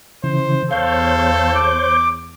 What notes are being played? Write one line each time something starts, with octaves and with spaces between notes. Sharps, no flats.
C#3 E3 C5
E2 A4 C5 C#5 F5 G6
D6